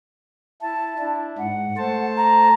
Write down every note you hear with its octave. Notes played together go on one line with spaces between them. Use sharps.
E4 A5
D4 E4
G#2 F#5
A3 C5 A5
A#5